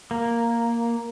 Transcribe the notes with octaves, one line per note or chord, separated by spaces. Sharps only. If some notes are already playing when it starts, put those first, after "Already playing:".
A#3